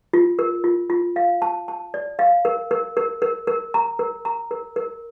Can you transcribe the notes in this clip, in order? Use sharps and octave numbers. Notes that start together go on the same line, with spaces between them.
F4
A#4
F4
F4
F5
A5
A5
D5
F5
A#4
A#4
A#4
A#4
A#4
A#5
A#4
A#5
A#4
A#4